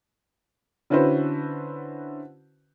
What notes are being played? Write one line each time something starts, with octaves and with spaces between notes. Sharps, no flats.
D3 C#4 E4 F#4 B4 C5